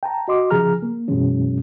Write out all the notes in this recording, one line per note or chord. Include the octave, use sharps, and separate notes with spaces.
G5 A5 A#5
F#4 D#5 C6 D6
C#3 F3 G#4 A#5 F6
A#3
F#2 B2 E3 F#3 G#3 C#4